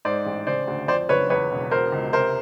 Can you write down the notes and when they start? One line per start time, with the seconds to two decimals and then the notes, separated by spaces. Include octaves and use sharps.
0.05 G#2 C5 D5
0.26 A1
0.47 C#3 C5 D5
0.67 D2
0.88 F2 C5 D5
1.09 F#1 B4 C#5
1.30 E2 B4 C#5
1.51 E1
1.71 B2 A#4 C5
1.92 C#2
2.13 C3 A#4 C5